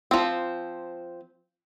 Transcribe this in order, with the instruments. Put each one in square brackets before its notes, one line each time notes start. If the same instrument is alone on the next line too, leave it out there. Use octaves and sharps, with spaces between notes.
[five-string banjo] F3 C4